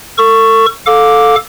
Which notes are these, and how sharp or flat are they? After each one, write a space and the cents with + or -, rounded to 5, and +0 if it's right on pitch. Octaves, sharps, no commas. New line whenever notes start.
A4 +40 C#6 +0
A4 +0 F5 +25 D6 -5